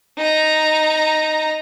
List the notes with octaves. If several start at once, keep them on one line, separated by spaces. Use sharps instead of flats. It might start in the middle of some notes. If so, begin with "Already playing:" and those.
D#4 A#5